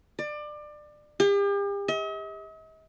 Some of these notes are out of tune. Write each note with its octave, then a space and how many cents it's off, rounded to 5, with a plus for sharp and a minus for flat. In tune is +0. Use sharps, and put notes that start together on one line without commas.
D5 +25
G4 +40
D#5 +45